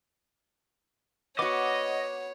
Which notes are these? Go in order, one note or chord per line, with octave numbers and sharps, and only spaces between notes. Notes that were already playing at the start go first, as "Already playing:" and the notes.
B3 F#4 C#5 D#5 F#5 D6